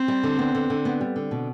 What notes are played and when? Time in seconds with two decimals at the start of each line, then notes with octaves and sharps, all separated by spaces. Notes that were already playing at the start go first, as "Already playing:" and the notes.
Already playing: C4
0.08 G3
0.23 D3
0.39 B3
0.55 D3
0.70 D3
0.85 B3
1.01 G3
1.16 D3
1.31 B2